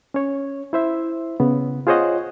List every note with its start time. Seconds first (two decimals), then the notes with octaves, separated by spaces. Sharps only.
0.14 C#4 C#5
0.73 E4 C5 E5
1.40 C#3 B3
1.87 F4 G#4 C5 C#5 D#5 F#5